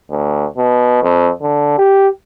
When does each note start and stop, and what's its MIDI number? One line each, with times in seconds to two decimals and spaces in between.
0.10 0.46 38
0.57 1.00 47
1.03 1.31 41
1.42 1.77 50
1.78 2.08 67